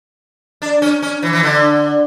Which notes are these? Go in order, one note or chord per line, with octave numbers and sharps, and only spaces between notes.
D4
C#4
C#4
E3
E3
D3